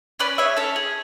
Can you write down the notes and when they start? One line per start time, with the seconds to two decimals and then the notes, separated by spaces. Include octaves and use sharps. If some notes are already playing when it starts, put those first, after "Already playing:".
0.19 C#4 B4 D5
0.38 G#4 C#5 E5
0.57 C#4 A4 C#5
0.76 G#4